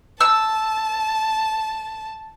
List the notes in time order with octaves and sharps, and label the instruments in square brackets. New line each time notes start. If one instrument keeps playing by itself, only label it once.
[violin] A5 [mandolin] E6